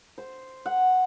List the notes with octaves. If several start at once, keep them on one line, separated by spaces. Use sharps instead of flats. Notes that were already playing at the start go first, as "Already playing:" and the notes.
C5
F#5